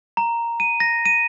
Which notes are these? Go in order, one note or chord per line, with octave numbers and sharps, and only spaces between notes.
A#5
D#7
A#6
D#7